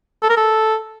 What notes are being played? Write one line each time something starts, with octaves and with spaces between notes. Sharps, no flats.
A4
A#4
A4